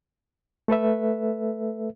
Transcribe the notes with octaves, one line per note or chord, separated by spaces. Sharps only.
A3 A4 B4 E5